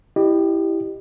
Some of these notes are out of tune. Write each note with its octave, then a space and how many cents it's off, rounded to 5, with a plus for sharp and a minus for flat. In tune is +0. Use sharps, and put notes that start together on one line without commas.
E4 +0 G4 +0 D#5 -35